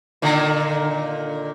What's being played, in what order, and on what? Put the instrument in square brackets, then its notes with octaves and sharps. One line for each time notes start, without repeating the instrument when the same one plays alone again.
[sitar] A#2 D3 D#3